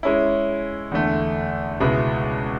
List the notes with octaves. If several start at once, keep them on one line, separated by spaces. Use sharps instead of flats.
G#3 C#4 E4
E2 D3 A3
C#2 B2 G#3 B3 E4